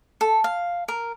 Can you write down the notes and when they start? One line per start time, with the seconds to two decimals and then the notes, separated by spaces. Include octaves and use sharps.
0.21 A4
0.44 F5
0.88 A#4